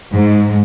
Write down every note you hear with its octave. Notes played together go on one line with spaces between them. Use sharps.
G#2